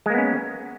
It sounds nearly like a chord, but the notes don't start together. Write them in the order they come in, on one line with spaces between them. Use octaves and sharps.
G#3 A#3 B3 C#4